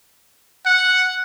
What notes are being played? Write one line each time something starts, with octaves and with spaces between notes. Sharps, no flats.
F#5